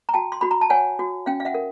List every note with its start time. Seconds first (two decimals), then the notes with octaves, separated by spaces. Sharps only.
0.09 A#5
0.14 F#4 G5 A5
0.32 C6
0.41 F#4 B5
0.51 A#5
0.61 A5
0.70 C#5 F#5 G#5
0.99 F#4
1.26 C#4 F5 G5
1.40 F5
1.45 E5 F#5
1.54 A#4